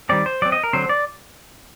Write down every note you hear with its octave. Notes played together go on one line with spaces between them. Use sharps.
D#3 G3 C4 D5
C5
F#3 C4 D5
D#5
A#4
D3 F#3 C4 C5
D5